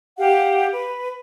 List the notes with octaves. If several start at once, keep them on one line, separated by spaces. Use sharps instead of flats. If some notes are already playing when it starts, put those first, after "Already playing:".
G4 F5 F#5
B4